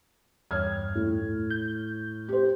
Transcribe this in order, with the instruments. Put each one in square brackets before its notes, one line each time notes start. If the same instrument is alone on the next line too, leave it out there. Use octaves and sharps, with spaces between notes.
[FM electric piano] E2 G2 [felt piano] C#5 F6 G#6
[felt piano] A2
[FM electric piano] G6
[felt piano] G4 C5